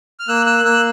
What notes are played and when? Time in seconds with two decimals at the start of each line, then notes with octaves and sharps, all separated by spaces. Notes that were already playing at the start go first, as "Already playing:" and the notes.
0.20 F6
0.28 A#3 E6 F#6
0.46 E6 F#6
0.64 A#3 E6 F#6